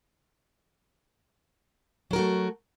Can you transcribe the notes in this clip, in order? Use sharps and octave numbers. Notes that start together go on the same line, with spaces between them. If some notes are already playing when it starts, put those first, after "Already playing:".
F#3 A3 F#4 A#4